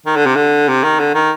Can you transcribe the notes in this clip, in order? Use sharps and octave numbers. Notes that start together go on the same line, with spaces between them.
D#3
D3
C3
D3
C3
D#3
D3
D#3